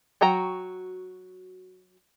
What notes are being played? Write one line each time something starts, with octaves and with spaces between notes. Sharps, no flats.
F#3 F#4 G5 A#5